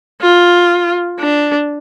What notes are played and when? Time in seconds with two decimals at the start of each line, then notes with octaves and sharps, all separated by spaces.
0.22 F4
1.20 D4